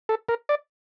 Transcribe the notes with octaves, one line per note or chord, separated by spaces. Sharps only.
A4
A#4
D5